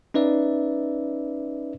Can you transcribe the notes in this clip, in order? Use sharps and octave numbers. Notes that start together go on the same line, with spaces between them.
C#4 D#4 B4 D5 E5